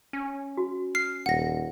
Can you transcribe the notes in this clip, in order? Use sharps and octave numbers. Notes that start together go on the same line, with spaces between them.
C#4
F#4
F6 C7
D#1 F#5 A#6